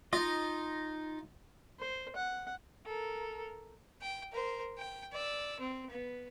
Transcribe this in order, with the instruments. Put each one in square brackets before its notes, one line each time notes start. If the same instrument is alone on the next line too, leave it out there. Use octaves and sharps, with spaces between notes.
[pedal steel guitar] D#4 D#5 [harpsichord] F4
[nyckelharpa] C5
F#5
[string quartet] A4 A#4
[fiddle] G5
A#4 C5
G5
D5 E6
C4
B3